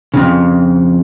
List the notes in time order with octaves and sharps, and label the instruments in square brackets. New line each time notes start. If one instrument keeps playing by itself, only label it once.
[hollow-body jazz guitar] F2 C#3